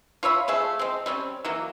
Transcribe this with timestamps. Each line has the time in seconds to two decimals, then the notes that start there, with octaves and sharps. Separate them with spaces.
0.23 F4 C#5 E5 B5
0.48 F3 A3 G#4 E5
0.79 G#3 C4
1.06 G3 C4 C#4
1.45 E3 F#3 A#3